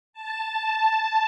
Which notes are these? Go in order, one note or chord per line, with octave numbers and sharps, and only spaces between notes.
A5